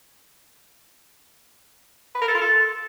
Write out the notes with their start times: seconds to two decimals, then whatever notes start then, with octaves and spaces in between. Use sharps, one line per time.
2.15 B4
2.22 A#4
2.28 A4
2.35 F4
2.41 A4